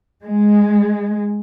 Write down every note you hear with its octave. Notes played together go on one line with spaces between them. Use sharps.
G#3